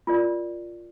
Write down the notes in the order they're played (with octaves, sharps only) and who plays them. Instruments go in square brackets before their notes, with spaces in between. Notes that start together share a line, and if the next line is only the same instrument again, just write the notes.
[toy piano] F4 A#4 D5